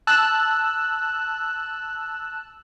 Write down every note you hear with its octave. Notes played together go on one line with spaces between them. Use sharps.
A5 E6 F#6